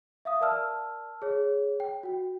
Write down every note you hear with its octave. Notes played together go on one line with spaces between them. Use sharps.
E5 F5 D#6
A#4 D5 A5 E6 F6
G#4 C#5
G5
F#4 G5